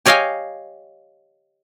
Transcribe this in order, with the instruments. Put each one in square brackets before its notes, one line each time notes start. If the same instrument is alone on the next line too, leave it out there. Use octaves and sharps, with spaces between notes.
[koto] G4 C#5 D#5 F5 G5 G#5